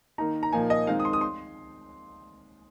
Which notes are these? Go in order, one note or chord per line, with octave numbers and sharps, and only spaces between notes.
D#3 A#3 D#4 A#5
A#5
A#2 F3 A#3 D#4 G#5
D#5
D#3 G#3 C4 D#4 F5
D#6
C6
D#6
C6